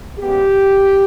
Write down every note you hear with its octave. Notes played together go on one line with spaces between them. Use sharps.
C#3 G#3 B3 G4